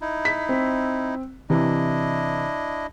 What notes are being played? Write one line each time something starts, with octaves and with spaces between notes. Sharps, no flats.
D#4 E4
B6
C4
C3 E3 D4 E4 D#5